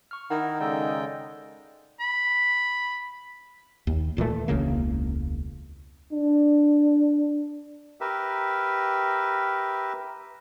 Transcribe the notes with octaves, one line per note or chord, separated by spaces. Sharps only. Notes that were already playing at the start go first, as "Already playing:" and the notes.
C#6 F6
D#3 D#4 E4 A#4 F#5
C#3 G#3 A4 D5 D#5 G5
B5
D#2
D#1 A#2 E3 A3
E1 C#2 C#3 A#3
D4
G4 A#4 B4 E5